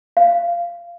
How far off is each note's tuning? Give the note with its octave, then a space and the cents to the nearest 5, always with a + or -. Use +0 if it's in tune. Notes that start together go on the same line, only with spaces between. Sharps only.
F5 -15